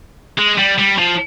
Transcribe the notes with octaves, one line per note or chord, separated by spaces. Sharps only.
G#3
G3
G3
F3